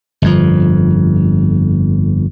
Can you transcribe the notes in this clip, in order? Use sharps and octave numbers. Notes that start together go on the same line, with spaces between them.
G1 F2 F3